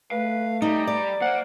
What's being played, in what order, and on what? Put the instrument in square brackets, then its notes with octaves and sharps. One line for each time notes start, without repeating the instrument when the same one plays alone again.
[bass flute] A3 [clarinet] B4 [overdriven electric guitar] F5
[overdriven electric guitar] G3 [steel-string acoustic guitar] D#4 [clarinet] A#5
[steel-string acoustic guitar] D5
[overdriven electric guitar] A#3 [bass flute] C5 [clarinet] F#5